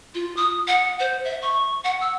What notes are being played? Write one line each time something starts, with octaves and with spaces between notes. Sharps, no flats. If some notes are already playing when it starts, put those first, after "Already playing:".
F4
D#6
F#5
C5
E5
C#6
F#5
E6